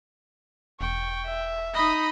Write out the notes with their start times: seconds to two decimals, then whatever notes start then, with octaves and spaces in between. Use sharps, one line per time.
0.81 E1 G5 C#6
1.25 E5
1.74 D#4 D#5 B5 D#6